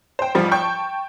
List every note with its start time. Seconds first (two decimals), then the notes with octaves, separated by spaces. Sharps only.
0.19 C5 G5
0.35 G#2 F3 G3
0.52 G5 A5 C#6 G6